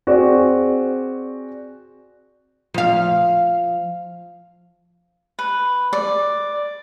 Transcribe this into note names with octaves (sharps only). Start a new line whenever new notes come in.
C4 F#4 G#4 D5
F3 F5
B4
D5